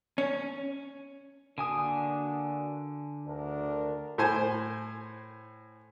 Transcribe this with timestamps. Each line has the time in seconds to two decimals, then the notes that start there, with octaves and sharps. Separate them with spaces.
0.18 C#4
1.58 D3 A#3 D4 F#4 G#5 D#6
3.26 D2 D4 A#4
4.18 A2 C5 G#5